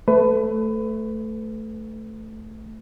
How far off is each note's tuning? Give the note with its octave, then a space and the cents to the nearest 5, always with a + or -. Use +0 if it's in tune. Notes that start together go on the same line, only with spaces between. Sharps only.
A3 +0 B4 +25